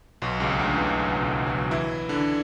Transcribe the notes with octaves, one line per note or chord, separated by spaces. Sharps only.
B1 B2
C#2 C#3
C#3
D2 D3
E2 E3
F#2 F#3
B2 B3
F#3 F#4
E3 E4
D3 D4